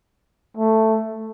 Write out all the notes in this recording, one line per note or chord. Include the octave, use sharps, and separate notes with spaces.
A3